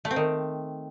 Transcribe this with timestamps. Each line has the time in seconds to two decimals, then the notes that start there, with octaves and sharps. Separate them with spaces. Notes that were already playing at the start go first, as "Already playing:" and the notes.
0.05 A3
0.11 C4
0.16 D#3